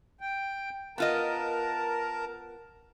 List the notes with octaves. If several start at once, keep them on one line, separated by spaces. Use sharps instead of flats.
G5
B3 F4 A#4 D#5 A5 A#5